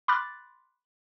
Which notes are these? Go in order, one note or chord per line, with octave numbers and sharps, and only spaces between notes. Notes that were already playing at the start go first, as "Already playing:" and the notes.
B5 C6 D6 F6 F#6 A6